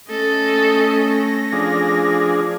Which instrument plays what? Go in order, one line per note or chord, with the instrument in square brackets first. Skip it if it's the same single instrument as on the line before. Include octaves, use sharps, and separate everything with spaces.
[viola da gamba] A3 C#4 [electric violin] A4 D#5
[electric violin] A#6
[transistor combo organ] F3 D4 G#4